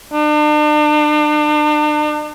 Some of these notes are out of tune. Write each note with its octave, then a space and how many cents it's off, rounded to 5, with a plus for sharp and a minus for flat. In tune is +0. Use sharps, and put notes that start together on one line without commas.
D4 +40